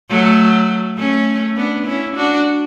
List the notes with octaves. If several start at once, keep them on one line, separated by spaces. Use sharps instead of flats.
F#3 A3
A3 C#4
B3 D4
C#4 E4
D4 F#4